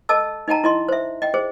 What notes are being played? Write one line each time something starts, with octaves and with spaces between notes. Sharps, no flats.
A4 D#5 A5 E6
D#4 D#5 G5 A5 A#5
E4 D#5 C6
C5 E5
D#5 G5
G#4 C5